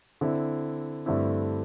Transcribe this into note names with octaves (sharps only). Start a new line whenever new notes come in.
D3 C4 E4
G2 D3 A3 C4 E4